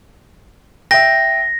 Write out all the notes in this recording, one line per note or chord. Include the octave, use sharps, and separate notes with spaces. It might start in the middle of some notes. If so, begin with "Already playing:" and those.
E5 G5 A#6